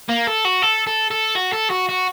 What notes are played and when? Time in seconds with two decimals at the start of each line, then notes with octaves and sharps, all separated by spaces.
0.09 A#3
0.27 A4
0.45 F#4
0.62 A4
0.87 A4
1.11 A4
1.35 F#4
1.52 A4
1.70 F#4
1.89 F#4